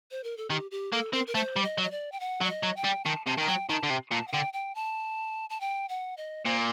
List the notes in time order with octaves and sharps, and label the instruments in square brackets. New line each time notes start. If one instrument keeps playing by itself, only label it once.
[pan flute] C5
A#4
A4
[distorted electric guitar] D#3 [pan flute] G4
[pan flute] G4
[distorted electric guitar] A#3 [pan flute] A4
[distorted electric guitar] C4 [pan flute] A#4
[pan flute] A#4
[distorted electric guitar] A3 [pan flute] C5
[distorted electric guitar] G3
[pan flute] D#5
[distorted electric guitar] F#3
[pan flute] D#5
D5
G5
F#5
[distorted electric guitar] F#3
[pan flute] D5
D#5
[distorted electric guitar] F#3
[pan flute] G5
[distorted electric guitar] G3
[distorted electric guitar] D#3 [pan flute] A5
[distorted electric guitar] C3 [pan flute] A5
[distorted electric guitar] D#3 [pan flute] A5
[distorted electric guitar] F#3 [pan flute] G5
[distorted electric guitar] D#3 [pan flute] A5
[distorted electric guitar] D3
C3
[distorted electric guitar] A#2 [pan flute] A5
[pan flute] F#5
[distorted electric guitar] D3 [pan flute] G5
[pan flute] G5
A5
A5
G5
F#5
D#5
[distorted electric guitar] A#2 [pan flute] C5